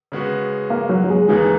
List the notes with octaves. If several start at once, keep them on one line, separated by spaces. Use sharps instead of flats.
C#3 G#3 B3 F#4
A#3
F#3
F#3
G#3
D#2 C#3 E3 G#3 A#3 D#4